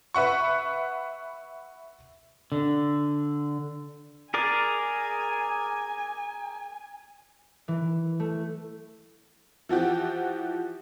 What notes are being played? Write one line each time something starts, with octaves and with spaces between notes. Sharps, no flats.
B4 E5 F#5 C#6
D3
G#4 A#4 D5 G#5
E3
A3
E3 F3 F#4 G4